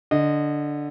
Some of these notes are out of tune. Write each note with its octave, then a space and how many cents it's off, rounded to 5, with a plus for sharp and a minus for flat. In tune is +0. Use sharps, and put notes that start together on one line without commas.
D3 +0 D#5 -20